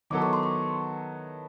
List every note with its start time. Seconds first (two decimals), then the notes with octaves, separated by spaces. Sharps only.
0.10 D#3 F#3 B3 E4 A4 D6
0.22 C#6
0.33 C6
0.43 C#6